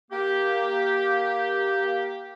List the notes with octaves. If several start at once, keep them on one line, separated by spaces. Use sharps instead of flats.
A#3 G4